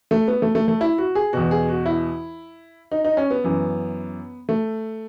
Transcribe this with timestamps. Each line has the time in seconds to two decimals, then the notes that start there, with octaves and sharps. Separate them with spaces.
0.11 A3
0.28 B3
0.42 A3
0.55 A3
0.68 A3
0.81 E4
0.98 F#4
1.15 G#4
1.33 E2 B2 F#4
1.51 G#4
1.69 F#4
1.86 E4
2.92 D#4
3.04 D#4
3.17 C#4
3.30 B3
3.44 F#2 E3
4.49 A3